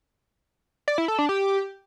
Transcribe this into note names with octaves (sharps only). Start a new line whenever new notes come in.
D5
E4
A4
D4
G4